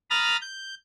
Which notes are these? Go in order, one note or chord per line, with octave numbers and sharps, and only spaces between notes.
A#5 B5 D#6 F6 A6
G6